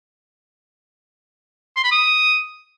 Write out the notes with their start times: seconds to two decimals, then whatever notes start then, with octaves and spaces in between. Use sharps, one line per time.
1.77 C6
1.84 B5
1.92 D#6